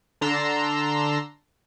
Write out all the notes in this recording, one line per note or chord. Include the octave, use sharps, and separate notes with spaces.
D3 D4 A5 A#5 C6 E6